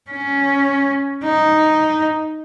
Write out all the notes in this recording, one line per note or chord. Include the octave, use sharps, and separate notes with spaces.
C#4
D#4